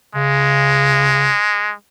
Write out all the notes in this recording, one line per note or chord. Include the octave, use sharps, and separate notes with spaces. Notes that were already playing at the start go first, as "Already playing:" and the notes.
C#3 G#3